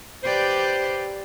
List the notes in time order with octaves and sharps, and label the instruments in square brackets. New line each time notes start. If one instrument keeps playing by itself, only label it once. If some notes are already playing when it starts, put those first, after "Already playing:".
[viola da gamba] G4 B4 D5 [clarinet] C5